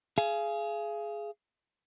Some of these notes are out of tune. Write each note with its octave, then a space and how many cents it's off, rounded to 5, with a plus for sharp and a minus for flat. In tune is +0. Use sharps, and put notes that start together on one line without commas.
G#4 +15 F5 -30